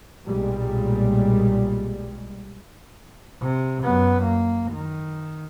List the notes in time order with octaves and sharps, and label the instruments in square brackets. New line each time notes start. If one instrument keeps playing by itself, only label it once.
[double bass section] B1 A#2 G3 G#3
[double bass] C3
F#2 B3
A#3
D#3